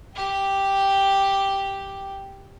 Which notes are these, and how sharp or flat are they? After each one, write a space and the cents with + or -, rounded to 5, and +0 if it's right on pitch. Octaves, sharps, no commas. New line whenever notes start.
G4 +0 G5 +0